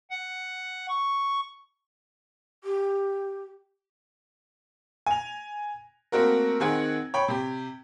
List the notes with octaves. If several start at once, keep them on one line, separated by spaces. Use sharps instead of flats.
F#5
C#6
G4
G#5 F7
A3 A#3 C4 F#4 A#4
D#3 C4 G#4 F#5 G#6
C#5 G5 B5
C3 G4